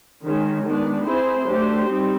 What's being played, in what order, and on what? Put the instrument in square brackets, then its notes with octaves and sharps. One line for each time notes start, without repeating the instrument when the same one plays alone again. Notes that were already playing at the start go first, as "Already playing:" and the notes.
[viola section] D#3 G#3 C#4
D#3 G#3 B3 D4
C4 E4 G#4 C5
F#3 A3 D4 G4 C5
G3 C4 D#4